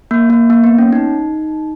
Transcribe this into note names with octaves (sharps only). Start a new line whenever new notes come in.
A#3
A#3
A#3
B3
C#4
D#4